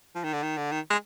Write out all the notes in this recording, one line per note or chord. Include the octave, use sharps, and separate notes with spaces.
F3
D#3
D3
D#3
D3
D#3
G#3